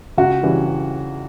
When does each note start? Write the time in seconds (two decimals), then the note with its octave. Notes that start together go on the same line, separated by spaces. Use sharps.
0.18 C#2 F#4
0.43 C#3 E3 G3